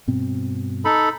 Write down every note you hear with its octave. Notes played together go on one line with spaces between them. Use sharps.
G2 B2 C4
D#4 A4 B5